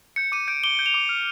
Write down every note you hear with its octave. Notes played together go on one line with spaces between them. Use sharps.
G6 C#7
D6 D#7
G6 D7
D6 G7
G6
F7
D6
F6